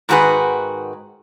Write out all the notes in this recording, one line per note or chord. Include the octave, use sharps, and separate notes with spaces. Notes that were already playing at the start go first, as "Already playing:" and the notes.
G#2 D#3 F#4 G#4 B4